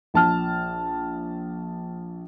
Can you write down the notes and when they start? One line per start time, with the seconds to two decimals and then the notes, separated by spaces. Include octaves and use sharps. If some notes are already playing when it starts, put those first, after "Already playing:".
0.14 A#1 A5 F6